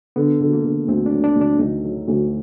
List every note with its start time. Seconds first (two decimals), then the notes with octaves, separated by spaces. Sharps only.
0.16 D3 B3
0.41 D3
0.53 A#3
0.64 D3
0.88 D2 C4
1.06 D4
1.12 F#3
1.24 D4
1.36 D2 D4
1.59 D2 D#4
1.84 F#3
2.08 D2